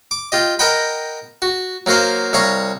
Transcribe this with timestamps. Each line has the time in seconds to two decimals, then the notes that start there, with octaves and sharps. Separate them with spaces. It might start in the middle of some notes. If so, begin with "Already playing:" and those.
0.11 D6
0.32 F4 G4 D#5
0.59 A#4 D#5 F#5 G5 B5
1.42 F#4
1.86 F#3 A#3 F#4 C5 F5
2.33 C2 C#5 F5 A#5 C#6